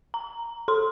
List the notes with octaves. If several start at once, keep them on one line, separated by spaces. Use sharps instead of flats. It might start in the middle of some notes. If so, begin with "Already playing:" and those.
A#5
A4 C6